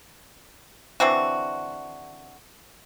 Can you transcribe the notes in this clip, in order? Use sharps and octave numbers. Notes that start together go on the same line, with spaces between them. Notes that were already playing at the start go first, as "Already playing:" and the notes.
D3 E3 C4 F#4